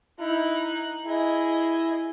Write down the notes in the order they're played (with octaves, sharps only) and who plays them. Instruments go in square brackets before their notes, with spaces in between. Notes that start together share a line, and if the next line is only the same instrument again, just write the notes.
[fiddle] D#4 F#6 [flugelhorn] E4
[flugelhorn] E4 [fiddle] G#4 D#5